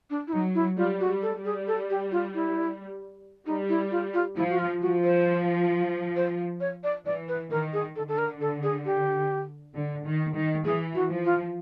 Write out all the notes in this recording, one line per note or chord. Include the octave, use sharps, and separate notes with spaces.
D4
E4
F#3 D#4
E4
G3 F4
F#4
G3
A4
G3
G#4
A4
G4
F4
E4
G3 D#4
E4
F4
F4
F3 E4
F#4
F4
F3 F#4
C5
C5
C#5
D5
E3 D5
B4
D#3 A#4
G#4
D3 A4
A4
A#4
A4
G#4
G4
D3
D#3
D#3
E3 G#4
F#4
F3
F4